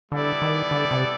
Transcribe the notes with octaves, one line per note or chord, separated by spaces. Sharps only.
D3 G3 B3 E4 A4 D5
D#3
D3
C3